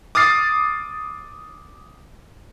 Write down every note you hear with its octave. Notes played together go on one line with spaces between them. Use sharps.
D6 D#6 F6 A6 C7